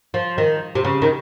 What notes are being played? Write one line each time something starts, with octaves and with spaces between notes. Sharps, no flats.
F3
D#3
C3
C#3
D#3